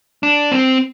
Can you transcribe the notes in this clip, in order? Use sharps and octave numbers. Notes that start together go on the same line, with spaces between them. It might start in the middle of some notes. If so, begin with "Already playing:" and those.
D4
C4